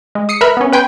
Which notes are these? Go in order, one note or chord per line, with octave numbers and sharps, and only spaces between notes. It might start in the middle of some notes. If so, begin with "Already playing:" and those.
G#3
D#6 C7 C#7
A#4 B4 E5 B5 F6 F#6
B3 C#4
B4 G5 G#5 C6